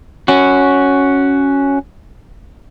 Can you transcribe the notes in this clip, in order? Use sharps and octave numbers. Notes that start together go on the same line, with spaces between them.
C#4 F#4